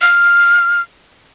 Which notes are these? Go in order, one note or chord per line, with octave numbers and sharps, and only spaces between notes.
F6